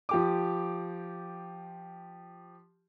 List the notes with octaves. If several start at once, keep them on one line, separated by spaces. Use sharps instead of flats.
F3 G4 D6